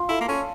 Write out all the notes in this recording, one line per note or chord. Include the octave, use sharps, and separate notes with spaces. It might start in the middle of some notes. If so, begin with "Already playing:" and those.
Already playing: D4 F4
E4 A4
A#3
C#4 A4